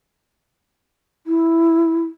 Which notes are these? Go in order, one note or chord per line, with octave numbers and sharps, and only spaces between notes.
E4